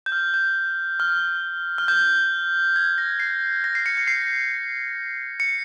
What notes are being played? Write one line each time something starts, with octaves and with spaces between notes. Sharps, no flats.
G6
F6
G6
F6
F6
G6
G#6
A#6
C7
A#6
C7
C#7
C#7
C7
C#7